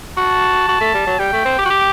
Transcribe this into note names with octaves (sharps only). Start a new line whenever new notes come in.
F#4 A5
F#4
A3
G3
F#3
G3 G5
A3
C4
G4
F#4
G4